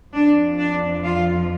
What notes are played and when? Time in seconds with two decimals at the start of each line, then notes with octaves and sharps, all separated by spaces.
0.14 F2 F3 D4
0.59 D4
1.04 F4